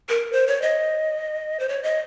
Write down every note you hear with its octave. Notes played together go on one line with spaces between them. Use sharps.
A#4
C5
C#5
D#5
C5
C#5
D#5